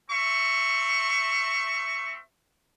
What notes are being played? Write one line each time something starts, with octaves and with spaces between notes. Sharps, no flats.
C4 E5 C#6